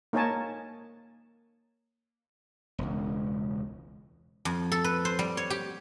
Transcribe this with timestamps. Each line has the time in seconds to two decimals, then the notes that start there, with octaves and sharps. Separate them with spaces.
0.13 A#3 D#4 A#4 C#5 G#5 A5
2.78 E1 C#2
4.45 F2
4.72 A4
4.84 B4
5.05 C5
5.19 G3
5.37 C#5
5.50 G4